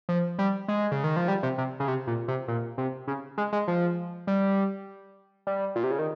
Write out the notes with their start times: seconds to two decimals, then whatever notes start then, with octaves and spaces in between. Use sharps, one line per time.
0.09 F3
0.39 G3
0.68 G#3
0.92 C#3
1.04 D#3
1.16 F3
1.28 G3
1.43 C3
1.58 C3
1.80 C#3
1.88 C3
2.07 A#2
2.28 C3
2.48 A#2
2.78 C3
3.08 C#3
3.38 G#3
3.53 G#3
3.68 F3
4.27 G3
5.47 G3
5.76 A#2
5.84 C3
5.91 C#3
5.99 D#3